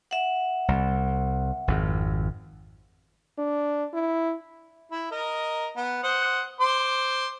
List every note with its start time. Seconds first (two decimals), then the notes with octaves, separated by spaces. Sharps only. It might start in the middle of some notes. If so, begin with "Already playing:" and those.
0.11 E5 F#5
0.68 C2
1.68 G#1 F2
3.38 D4
3.94 E4
4.91 E4
5.12 A#4 D#5
5.76 B3
6.03 C5 F#5 D#6
6.60 C5 C6 D6